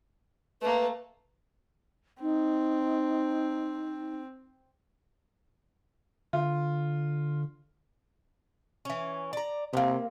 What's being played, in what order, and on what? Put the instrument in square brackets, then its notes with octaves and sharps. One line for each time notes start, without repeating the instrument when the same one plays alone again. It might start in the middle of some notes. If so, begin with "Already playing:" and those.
[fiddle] A3 A#3 [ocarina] B4
[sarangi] C4 [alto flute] D#4
[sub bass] D3 [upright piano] F4
[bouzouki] E3 C#4
D5 A#5
[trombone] C3 [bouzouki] A#3 B3